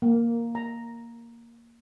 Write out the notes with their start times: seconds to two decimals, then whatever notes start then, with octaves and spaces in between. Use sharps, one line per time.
0.02 A#3
0.55 A#5